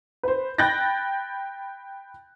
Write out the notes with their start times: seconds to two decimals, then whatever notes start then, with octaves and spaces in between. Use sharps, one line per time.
0.23 B4 C5
0.58 G5 B5 F#6 G6 A6 A#6